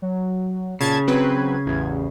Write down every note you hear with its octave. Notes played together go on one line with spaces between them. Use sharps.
F#3
A#2 C#3 A5 G#6 A6
F#3 C4 B4 G#6
A1 E2